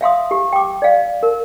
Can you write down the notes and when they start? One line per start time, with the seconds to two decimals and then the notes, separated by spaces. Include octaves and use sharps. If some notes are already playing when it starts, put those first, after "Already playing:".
0.01 E5 F5 C6 D#6
0.31 G4
0.53 G5 D6
0.82 D5 F5
1.23 A#4